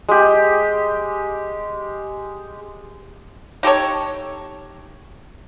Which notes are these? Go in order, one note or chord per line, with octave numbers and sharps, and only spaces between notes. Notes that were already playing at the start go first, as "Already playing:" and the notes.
G#3 G4
D#4 G4 A4 C#5